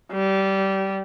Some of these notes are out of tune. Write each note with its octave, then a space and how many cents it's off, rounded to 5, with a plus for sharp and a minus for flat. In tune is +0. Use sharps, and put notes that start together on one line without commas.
G3 -20